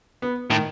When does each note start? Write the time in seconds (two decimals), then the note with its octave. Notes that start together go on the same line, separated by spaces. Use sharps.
0.22 B3
0.50 A2 D#3